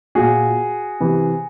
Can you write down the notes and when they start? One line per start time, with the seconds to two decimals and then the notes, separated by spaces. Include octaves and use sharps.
0.15 A#2 F#4 G#4
1.00 C3 E3